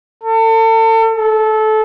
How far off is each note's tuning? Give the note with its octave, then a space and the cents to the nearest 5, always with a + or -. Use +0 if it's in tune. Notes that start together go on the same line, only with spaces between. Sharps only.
A4 +35
A4 -20